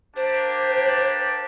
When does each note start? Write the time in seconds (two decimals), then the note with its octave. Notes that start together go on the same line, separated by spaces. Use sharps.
0.16 A#3 D4 G4 C5